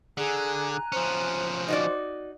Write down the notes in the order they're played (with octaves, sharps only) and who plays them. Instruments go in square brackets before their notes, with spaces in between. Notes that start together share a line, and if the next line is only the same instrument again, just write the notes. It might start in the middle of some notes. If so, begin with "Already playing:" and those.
[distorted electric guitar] D3 [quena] G#4 [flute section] G#5 A#5 F#6
[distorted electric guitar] F3 C#4 [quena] C5
[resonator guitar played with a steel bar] D#4 F#4 D5